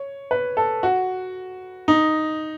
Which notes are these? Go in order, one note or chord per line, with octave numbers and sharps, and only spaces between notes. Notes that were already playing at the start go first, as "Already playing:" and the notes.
Already playing: C#5
B4
A4
F#4
D#4